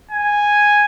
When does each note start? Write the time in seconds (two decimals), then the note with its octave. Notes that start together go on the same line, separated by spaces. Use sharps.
0.11 G#5